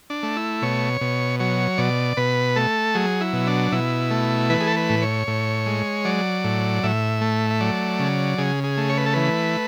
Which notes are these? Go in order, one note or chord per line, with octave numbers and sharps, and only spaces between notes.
D4
A3
E4
B2 C#5
B2
F#3 C#5
B2 D5
B2 B4
A3 A4
F#3 G#4
E4
B2
D4
B2 E4
A3
E3 B4
G#4
A4
B4
A2
C#5
A2
G#3
F#3 D5
A2
A2 E5
A3
E5
F#3 D5
C#3
C#3 G#4
G#4
A3
C#5
B4
A4
E3 B4